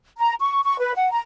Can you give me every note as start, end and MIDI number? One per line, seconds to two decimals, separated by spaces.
0.18 0.34 82
0.41 0.60 85
0.64 0.78 85
0.79 0.94 71
0.95 1.10 78
1.11 1.20 82